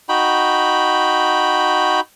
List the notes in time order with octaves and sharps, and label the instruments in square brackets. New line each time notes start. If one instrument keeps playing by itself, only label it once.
[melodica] D#4 F#4 G5 B5